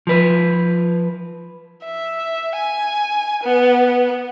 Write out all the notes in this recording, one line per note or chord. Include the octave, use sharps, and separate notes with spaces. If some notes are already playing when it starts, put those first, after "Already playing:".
F3 B4
E5
G#5
B3